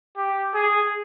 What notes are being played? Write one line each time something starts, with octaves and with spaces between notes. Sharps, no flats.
G4
G#4